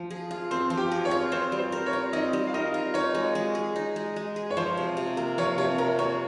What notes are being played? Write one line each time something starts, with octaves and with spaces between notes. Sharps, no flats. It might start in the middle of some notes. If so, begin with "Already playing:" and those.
Already playing: F3
G#4
F4
C4 C5 C6
F3
G4 G5
G#4
C#5
F4
C4 C5
G3
C5
A#4
C#5
F4
C4 D#4 D#5
G3
F5
D#4 A#4 D#5
F4
D#4 C#5
G#3
G#3
G#4
D#4
G#3
G#3
G#4
C#5
F3 C5
C3
C3
A#3
F3 C#5
C3 C#5
C3 A#4 A#5
A#3 C#5 C#6